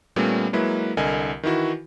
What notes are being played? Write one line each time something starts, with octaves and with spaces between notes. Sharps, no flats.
A#2 G3 A3 B3 C#4
F#3 G#3 A#3 E4 B4
C2 D3 A#4 D#5 G#5
D#3 E3 E4 F#4